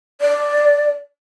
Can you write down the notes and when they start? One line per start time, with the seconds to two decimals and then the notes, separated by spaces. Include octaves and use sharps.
0.21 D5